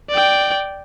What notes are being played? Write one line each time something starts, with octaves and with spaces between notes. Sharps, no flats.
D5 G5